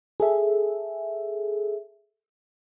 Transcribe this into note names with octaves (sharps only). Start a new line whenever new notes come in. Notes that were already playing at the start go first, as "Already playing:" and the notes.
G#4 A4 E5